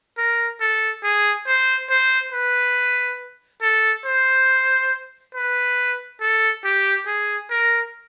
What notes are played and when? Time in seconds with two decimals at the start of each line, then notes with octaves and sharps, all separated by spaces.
0.18 A#4
0.61 A4
1.04 G#4
1.47 C5
1.90 C5
2.33 B4
3.63 A4
4.06 C5
5.35 B4
6.21 A4
6.65 G4
7.07 G#4
7.50 A#4